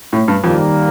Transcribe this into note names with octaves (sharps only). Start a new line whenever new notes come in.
A2
G2
F2 D#3 G3 A#3